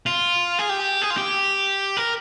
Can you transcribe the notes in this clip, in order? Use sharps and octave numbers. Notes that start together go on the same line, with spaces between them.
F4
G#4
G4
G#4
F4
G4
A#4